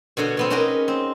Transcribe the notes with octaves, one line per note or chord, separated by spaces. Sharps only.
B2 D3 F#4 C#5
B2 B3 C4
C#4 D#4 F#4 G#4 A#4 B4
C4